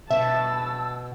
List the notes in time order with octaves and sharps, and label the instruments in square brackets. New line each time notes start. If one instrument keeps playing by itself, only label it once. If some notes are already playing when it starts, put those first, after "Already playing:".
[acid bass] B2 [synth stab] E5 [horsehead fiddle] A5 [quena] E6